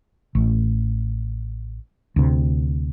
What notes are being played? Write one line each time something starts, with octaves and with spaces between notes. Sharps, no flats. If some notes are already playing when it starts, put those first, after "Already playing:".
A1
D2 C3